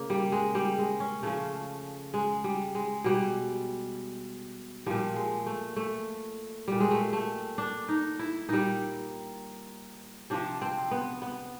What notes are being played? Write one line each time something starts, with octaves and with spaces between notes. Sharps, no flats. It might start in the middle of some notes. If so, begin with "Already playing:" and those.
Already playing: C#3 A#3
G3
G#3
G3
G#3
C#4
C#3 F3 A3
G#3
G3
G#3
B2 G3
A#2 F3 G3
G#3
A3
A3
A#2 G3
G#3
A3
A3
D4
D#4
E4
A#2 G3 D#4
C3 F3 D4
C4
B3
B3